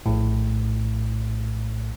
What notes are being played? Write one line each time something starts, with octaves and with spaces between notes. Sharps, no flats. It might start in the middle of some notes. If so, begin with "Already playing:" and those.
A#1 A2